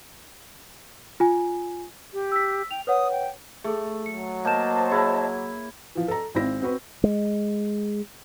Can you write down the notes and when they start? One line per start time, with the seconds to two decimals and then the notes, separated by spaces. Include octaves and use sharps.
1.20 F4 G#5
2.13 G4
2.32 E6 B6
2.71 G5 F7
2.87 B4 C#5 F#5 D#6
3.12 G5
3.64 A3 G#4 A4
4.06 F#3 C#7
4.45 A#3 C5 C#5 D#5 A5 G6 E7
4.92 E4 G#4 C#5
5.95 E3 F3
6.08 A4 A#5
6.35 G#1 C4 E4 A#6
6.62 C4 F#4 B4
7.04 G#3